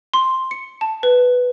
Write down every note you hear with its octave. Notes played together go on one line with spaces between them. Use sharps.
C6
C#7
A5
B4